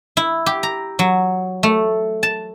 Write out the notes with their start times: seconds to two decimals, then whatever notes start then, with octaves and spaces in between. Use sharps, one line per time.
0.17 E4
0.46 G4
0.63 A#5
0.99 F#3
1.63 A3
2.23 A5